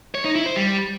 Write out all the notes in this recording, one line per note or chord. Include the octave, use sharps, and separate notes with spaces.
C#5
D#4
E4
C5
G3